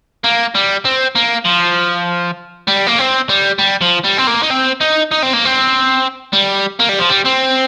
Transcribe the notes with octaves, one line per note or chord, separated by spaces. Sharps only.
A#3
G3
C4
A#3
F3
G3
A#3
C4
G3
G3
F3
G3
C4
A#3
D#4
C4
D#4
D#4
C4
A#3
C4
G3
A#3
G3
F3
G3
C4